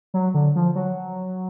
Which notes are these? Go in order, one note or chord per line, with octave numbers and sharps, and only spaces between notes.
F#3
D3
F3
F#3